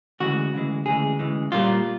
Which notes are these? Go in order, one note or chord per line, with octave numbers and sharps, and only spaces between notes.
D2 C#3 E3 G#3 F#4
D2 C#3 E3 G#3
D2 C#3 E3 G#3 G#4
D2 C#3 E3 G#3
A#2 G3 A#3 F4